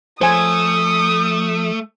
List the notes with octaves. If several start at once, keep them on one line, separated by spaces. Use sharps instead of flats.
F3 A3 C5 G#5 D#6